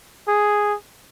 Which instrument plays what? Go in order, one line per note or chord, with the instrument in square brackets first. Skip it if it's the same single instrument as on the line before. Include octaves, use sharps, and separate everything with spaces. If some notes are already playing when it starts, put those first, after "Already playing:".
[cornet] G#4